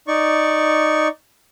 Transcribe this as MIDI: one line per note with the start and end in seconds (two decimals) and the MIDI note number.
0.07 1.08 63
0.07 1.08 74
0.07 1.08 85